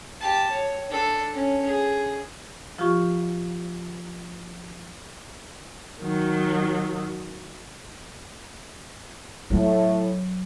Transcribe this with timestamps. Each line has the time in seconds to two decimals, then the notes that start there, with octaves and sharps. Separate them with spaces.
0.20 G4 A5
0.50 C#5
0.89 D4 A4
1.34 C#4
1.66 G#4
2.78 F3 F4 G4 C#6
6.02 D#3 F#3
9.50 A2 F#3